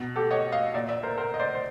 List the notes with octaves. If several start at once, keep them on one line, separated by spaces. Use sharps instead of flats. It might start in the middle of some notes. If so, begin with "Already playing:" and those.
Already playing: B2
G4 A4
C#5 D#5
D#5 F5
A#2 D5 E5
D5 E5
A#4 C5
A#4 C5
D#5
C5 D5
C5